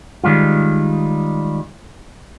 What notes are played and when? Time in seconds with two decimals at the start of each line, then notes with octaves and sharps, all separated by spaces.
0.24 D#3 G3 G#3 F4